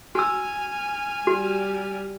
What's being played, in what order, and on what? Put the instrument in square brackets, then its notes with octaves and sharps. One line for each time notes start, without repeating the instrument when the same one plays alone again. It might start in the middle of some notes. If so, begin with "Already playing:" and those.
[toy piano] F#4 E6 [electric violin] G#5 F6
[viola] G3 [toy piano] F#4